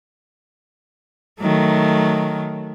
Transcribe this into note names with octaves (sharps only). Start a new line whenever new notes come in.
D#3 F#3 A3